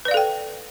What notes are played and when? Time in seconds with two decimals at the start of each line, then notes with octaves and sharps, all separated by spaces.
0.05 B4
0.08 D5
0.11 F5
0.14 A4
0.17 G5